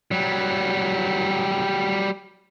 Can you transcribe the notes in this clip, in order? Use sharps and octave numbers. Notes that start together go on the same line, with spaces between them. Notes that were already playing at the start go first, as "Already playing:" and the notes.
F#3 G3